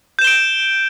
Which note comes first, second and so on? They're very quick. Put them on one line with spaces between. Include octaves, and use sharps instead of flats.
G6 E7 G7 D7